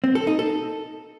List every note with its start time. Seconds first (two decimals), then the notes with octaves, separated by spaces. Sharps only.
0.04 C4
0.15 A4
0.27 D#4
0.39 A4